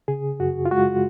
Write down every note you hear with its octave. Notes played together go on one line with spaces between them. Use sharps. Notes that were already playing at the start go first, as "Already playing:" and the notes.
C#3 G#4
F#2 F#4
F4
G#3 F#4